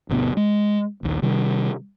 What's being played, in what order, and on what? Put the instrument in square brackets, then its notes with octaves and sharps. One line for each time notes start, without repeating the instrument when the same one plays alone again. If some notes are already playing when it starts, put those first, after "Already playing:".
[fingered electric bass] G1 D2 B2
G#3
A#1 D#2
C3 D#3 G3